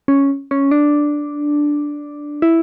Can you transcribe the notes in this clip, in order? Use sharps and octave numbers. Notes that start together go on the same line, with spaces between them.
C#4
C#4
D4
E4